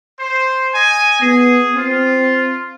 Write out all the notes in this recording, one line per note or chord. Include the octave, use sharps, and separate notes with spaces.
C5
D#5 G#5
B3 G#4
C4 F4